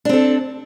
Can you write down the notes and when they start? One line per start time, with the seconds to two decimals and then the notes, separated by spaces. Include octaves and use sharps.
0.05 D4
0.09 C4
0.13 A4